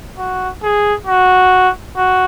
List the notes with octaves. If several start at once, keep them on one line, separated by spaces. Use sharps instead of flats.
F#4
G#4
F#4
F#4